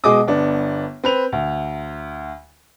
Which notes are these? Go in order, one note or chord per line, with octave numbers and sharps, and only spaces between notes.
B2 G#3 G#4 D#5 D6 D#6
G1 B3 D4
C4 B4 F7
D2